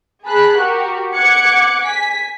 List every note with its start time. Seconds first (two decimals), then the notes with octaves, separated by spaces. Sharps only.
0.25 G#4 A5 B5 F#6
0.56 F#4 G4 A#4
1.15 F#5 D6 F#6 G#6 C#7
1.84 G#5 B6